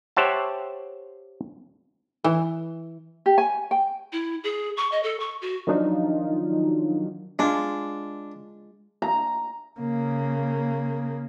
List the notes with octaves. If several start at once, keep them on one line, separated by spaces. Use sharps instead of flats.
G4 C5 C#5 E5 F#5 A5
E3
G4
G#5
G5
E4
G#4
C#6
D#5
A4
C#6
F#4
D#3 F3 F#3 D4 D#4 F4
G#3 D4 F4
A#5
C#3 A#3